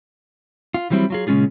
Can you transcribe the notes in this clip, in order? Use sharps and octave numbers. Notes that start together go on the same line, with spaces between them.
F4
E3 F#3 G3 C4 E4
F#3 F4 G#4
A#2 C#3 G#3 C#4 F4 G#4